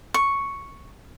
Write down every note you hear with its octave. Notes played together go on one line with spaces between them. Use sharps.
C#6